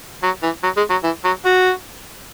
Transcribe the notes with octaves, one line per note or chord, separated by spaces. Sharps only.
F#3
E3
F#3
G#3
F#3
E3
F#3
F#4